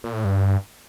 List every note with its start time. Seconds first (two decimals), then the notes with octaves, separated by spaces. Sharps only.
0.04 A#2
0.13 A2
0.25 G2